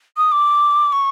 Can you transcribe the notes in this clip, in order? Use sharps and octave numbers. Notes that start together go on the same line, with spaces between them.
D#6
D6
C#6